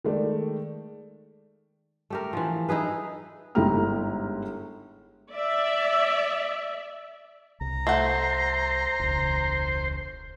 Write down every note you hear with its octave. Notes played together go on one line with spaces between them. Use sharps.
D#3 G#3 A3 D5
A3 G4 A#4
E3 F3
D#4 E4 G#4 B4
G1 G#2 E4 G4 A#5 F6
D5 E5
C2 A#5
A3 C5 F#5
E1 C#2